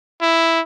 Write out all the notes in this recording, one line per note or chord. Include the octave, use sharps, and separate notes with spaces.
E4